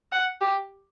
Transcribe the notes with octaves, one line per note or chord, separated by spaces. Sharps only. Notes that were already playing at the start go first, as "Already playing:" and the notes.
F#5
G4